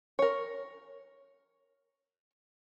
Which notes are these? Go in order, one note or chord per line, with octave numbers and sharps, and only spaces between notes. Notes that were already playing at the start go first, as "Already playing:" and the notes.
A#4 C#5